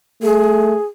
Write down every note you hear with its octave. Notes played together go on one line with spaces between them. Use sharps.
A3 G#4